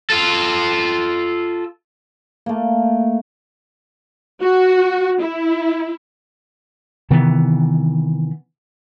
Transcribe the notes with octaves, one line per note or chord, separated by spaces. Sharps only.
F4 A4
A3 A#3
F#4
E4
C3 D#3 E3 B3